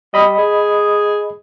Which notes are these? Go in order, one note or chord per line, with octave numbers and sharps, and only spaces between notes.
G3 D#5 B5 D#6
G#4